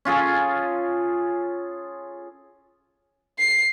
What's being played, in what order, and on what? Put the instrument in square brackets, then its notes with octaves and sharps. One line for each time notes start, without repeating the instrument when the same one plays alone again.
[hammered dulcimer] C#4 F4 G#4 A4
[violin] C7